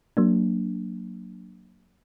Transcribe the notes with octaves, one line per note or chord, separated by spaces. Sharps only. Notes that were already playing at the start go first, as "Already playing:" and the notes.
F#3 A#3 D4